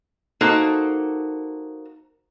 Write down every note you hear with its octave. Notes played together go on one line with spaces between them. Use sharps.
A#3 D#4 F#4 A4 C5